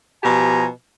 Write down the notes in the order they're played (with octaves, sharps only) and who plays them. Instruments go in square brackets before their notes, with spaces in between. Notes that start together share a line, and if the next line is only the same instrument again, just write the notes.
[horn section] B2 F3 G4 G#5 A#5